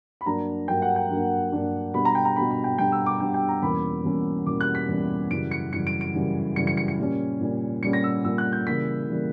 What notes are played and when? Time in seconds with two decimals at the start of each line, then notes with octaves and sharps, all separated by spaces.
0.21 B5
0.26 G2 F#3 A#3 D4 A#5
0.68 G2 F#3 A#3 D4 G5
0.82 F#5
0.96 G5
1.10 G2 F#3 A#3 D4
1.52 G2 F#3 A#3 D4
1.94 B2 G3 B3 D4 B5
2.05 A#5
2.15 G5
2.25 A#5
2.36 B2 G3 B3 D4 B5
2.51 B5
2.64 G5
2.78 B2 G3 B3 D4 G5
2.92 E6
3.06 D6
3.20 B2 G3 B3 D4 G5
3.34 G5
3.49 A#5
3.62 E2 B2 G3 A#3 C#4 B5
4.04 E2 B2 G3 A#3 C#4
4.46 E2 B2 G3 A#3 C#4 D6
4.61 F#6
4.75 B6
4.89 E2 B2 G3 A#3 C#4
5.31 F#2 C#3 E3 G3 D7
5.51 C#7
5.72 F#2 C#3 E3 G3 C#7
5.87 D7
6.01 D7
6.14 F#2 C#3 E3 G3
6.56 F#2 C#3 E3 G3 C#7
6.67 C#7
6.77 C#7
6.88 C#7
6.99 A#2 G3 C#4
7.41 A#2 G3 C#4
7.82 A#2 G3 C#4 C#7
7.93 A#6
8.04 E6
8.24 A#2 G3 C#4 E6
8.38 F#6
8.53 G6
8.66 C#3 E3 G3 A#3 B6
9.09 C#3 E3 G3 A#3